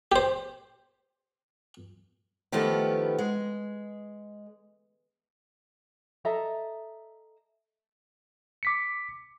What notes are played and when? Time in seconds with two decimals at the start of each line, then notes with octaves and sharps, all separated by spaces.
0.12 G4 C5
2.52 D#3 F3 A3 B3 G4
3.19 G#3
6.25 A4 D#5 E5 A#5
8.63 D6 B6 C#7